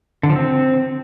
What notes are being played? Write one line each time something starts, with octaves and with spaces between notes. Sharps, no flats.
D3
F3
C4